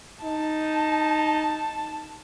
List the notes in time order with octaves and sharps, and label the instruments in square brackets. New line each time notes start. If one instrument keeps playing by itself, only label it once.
[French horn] D#4 [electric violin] A5